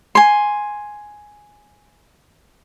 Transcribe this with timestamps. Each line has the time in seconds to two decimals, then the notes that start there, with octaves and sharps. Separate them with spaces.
0.15 G#5 C6